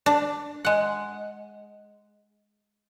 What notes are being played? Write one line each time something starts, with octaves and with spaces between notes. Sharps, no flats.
D4
G#3 F#5